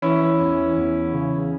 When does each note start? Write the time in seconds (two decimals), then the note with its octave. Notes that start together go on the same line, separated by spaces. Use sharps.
0.02 E3 C#4 E4
0.39 E2
0.76 E2
1.13 C#3